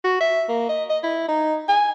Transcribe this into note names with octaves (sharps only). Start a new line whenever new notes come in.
F#4
E5
A#3
D#5
D#5
E4
D#4
G#5